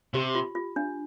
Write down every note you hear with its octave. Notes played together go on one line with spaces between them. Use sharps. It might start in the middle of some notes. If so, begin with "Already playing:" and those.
C3 G4
F4
F4
D4